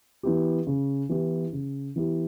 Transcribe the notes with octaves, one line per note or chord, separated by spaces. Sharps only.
E3 B3 E4 G4
C#3
E3 B3 E4 G4
C#3
E3 B3 E4 G4